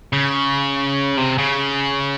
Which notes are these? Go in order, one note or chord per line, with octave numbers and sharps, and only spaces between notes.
C#3
C3
C#3